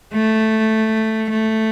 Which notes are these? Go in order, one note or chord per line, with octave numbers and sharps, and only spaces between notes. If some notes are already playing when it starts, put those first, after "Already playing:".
A3
A3